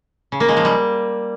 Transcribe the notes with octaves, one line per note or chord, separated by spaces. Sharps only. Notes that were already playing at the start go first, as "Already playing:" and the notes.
C#3
A#3
G#3
F3
G3